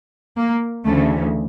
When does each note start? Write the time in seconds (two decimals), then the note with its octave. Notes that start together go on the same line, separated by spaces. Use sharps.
0.38 A#3
0.86 D2 C#3 E3 A3